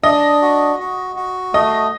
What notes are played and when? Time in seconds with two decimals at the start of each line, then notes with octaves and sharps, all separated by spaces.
0.03 D4 D#5
0.42 F#4
0.80 F#4
1.16 F#4
1.54 A3 D#5